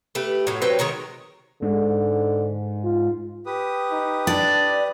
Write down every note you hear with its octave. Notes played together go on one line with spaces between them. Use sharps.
A3 G4 B4
A2 F#3
F#3 C4 B4 G5
D#3 G#3 A#4 C#5
G#2 D3
F4
G4 B4 D#6
D#4
D4 D5